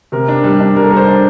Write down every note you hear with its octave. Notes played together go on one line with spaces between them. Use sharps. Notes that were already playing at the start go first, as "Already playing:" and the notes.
C3 A#4
D4
G3
D4
G3 A#4
A4
G3 A#4
A4 C5
D4